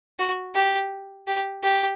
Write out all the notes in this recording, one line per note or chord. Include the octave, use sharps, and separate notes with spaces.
F#4
G4
G4
G4